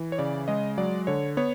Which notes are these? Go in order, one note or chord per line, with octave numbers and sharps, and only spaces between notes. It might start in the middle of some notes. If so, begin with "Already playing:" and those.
Already playing: E3
C#5
C#3 D5
G#3 D#5
F#3 D5
D3 C#5
B3 C#5